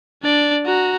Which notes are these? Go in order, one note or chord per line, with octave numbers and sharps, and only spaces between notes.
D4 D5
F#4 A#5